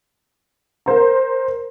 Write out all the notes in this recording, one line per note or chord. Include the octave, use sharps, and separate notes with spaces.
A#4 C5 A#5